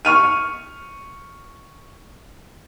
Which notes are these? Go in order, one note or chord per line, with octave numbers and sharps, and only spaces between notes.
C#6 F6 D#7